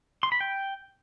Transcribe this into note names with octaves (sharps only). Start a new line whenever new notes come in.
C6
B5
G5